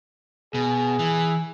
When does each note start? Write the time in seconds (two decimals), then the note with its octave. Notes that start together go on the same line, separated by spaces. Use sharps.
0.54 B2 G#4
0.99 E3